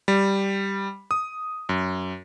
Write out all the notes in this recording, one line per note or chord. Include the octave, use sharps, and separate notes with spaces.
G3
D#6
F#2